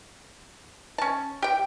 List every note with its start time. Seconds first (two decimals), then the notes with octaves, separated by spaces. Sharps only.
0.98 C#4 A5
1.42 G4 G5